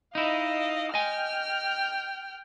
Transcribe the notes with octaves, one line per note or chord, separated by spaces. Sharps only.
D#4 E4 D#5 F5
D#5 G5 G#5 F6